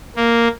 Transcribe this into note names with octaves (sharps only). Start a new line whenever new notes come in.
A#3